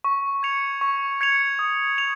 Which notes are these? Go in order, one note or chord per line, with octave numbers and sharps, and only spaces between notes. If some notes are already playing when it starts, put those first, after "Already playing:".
C#6
G#6 C#7 F7
C#6
G#6 C#7 F7
D#6
F7